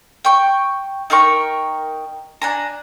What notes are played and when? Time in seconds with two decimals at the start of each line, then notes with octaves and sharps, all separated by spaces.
0.24 G5 C#6
1.10 D#4 A#4 G5 C#6
2.42 D4 G#5 A#5